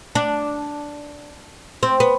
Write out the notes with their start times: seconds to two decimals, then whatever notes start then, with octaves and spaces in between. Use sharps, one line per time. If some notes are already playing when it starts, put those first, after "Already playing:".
0.15 D4
1.83 C4
2.00 B3